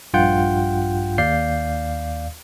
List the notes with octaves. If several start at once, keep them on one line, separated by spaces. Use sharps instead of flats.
A#1 G2 F4 F#5 G5 G6
D#2 D5 F5 G6 C7